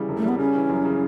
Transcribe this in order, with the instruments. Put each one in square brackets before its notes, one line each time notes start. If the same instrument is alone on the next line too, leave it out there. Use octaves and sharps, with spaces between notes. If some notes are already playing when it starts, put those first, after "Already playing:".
Already playing: [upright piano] C#3 E3 G3
E1
[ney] A3
[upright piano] G3 [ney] B3
[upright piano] C#3 [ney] C#4
[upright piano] E3
F#2
C#3